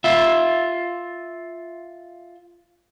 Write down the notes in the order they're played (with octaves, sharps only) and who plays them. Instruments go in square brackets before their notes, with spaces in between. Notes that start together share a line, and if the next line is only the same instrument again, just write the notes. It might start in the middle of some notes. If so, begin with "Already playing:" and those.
[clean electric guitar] F4 E5